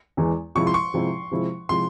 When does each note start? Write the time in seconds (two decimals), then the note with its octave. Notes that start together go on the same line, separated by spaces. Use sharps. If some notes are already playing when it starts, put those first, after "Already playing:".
0.17 E2 E3 G#3
0.55 C3 F3 G#3 E4 C#6
0.67 C6
0.74 C#6
0.94 C3 F3 G#3 E4
1.31 C3 F3 G#3 E4
1.69 C3 F3 G#3 E4 C6